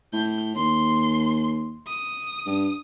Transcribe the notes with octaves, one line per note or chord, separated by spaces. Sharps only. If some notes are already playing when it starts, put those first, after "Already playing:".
A2 G6
D#2 C6
D#6
G2